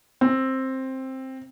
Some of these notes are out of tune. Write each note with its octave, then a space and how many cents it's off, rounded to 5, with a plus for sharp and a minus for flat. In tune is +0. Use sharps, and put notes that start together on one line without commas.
C4 +10